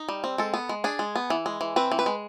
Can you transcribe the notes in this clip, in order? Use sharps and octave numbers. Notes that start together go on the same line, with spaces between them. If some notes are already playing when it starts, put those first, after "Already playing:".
Already playing: D#4
G3
C4
G#3 A4
B3
G#3
D4 G#4
G#3
B3
E3
G#3
E3
C4 B4
E3
B4
G#3